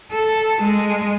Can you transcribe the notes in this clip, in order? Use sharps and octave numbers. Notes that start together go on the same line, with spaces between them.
A4
G#3